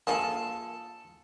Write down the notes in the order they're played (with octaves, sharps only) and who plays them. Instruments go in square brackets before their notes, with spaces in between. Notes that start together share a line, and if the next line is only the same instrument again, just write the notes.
[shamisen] A#3 F4 G#4 [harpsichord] A4 A5